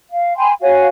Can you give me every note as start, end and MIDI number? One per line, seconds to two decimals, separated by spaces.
0.10 0.35 77
0.36 0.53 79
0.36 0.53 80
0.36 0.53 83
0.36 0.53 84
0.61 0.87 66
0.61 0.87 73
0.61 0.87 77
0.61 0.87 80